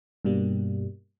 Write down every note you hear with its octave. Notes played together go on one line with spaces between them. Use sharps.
G2 B2 G3 A#3